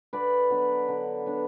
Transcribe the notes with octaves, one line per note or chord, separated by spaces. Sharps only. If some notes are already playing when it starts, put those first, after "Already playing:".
D3 B4 D5
F#3 B3 D4
D3
F#3 B3 D4